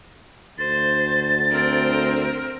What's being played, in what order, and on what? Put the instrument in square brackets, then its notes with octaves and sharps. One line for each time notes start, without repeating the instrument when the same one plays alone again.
[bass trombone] D2 [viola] C5 [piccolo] A6
[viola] C4 A#4